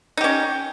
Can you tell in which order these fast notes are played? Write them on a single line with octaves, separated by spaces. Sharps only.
D#4 G4 C#4